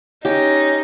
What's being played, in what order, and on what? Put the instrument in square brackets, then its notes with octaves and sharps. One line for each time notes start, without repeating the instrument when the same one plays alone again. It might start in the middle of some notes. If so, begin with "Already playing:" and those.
[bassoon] C#4 [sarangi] D#4 [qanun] G4